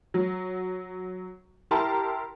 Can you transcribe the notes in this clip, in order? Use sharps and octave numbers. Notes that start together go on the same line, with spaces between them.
F#3
E4 G4 A#4 A5 A#5 C6